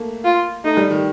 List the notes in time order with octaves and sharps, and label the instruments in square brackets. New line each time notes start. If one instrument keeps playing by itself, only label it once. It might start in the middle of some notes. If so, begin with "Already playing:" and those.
Already playing: [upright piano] A3 A#3
[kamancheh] F4
[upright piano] A3 [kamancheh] D#4
[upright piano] G3
D#3